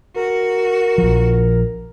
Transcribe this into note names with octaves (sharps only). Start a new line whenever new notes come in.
F#4 A#4
A#1 F3